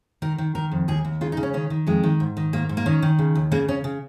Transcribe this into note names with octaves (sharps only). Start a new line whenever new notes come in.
D#3 A#4
D#3
D#3 A#4
F2
D#2 G#4
D#2
C#3 F4
D#4
C#3
C#4
D#3 C#4
D#3
F2 G#3
D#3
G#2
D#3
G#2 A#3
G#2
A#3
D#3 C#4
D#3
C#3
D#2
C#3 A#3
C#3 C#4
C#3